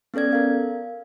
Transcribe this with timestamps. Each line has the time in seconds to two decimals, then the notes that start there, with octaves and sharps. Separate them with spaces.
0.14 B3 C#4 A4 D5 G#6
0.33 A#4 F5